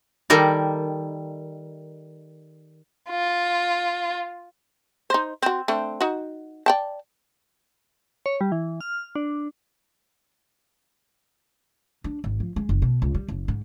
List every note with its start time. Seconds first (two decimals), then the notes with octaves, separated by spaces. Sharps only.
0.30 D#3 G3 A4 A#4 D5
3.09 F4
5.10 D#4 C5
5.42 C4 F#4
5.68 A3 C4 D4
6.01 D#4 F#4
6.66 D5 G5 A5
8.26 C#5
8.41 G3
8.52 E3
8.81 F6
9.16 D4
12.04 D4
12.24 G#1
12.40 F3
12.56 G#3
12.69 F#1
12.82 B2
13.02 C#2
13.15 G3
13.28 F#1
13.48 G#2